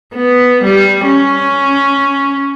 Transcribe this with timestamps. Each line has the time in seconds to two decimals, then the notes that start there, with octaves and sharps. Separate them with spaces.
0.15 B3
0.64 G3
1.06 C#4